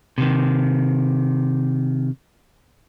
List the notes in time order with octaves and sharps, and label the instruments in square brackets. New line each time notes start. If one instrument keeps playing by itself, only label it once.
[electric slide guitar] C3 D#3